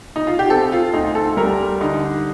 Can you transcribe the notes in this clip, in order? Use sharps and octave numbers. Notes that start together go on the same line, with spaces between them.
D#4
F4
G4
C4 A4
F4
D2 D#4
A4
G3 A#4
D3 D#4